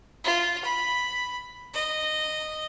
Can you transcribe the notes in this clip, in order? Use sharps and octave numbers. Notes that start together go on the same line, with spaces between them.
F4
B5
D#5